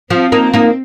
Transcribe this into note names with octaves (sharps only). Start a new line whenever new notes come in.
F3 C4
A#3 D#4
A#3 D#4